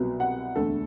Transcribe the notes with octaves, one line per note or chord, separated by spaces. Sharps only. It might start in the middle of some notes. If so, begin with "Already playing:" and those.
Already playing: C2 B2 F#3 B3
F#5
E1 D2 D3 A3 A4